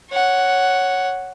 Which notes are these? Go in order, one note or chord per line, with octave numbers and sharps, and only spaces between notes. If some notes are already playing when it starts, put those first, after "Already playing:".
C#5 F#5